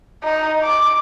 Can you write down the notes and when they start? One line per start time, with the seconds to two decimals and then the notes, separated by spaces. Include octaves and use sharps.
0.24 D#4
0.64 D6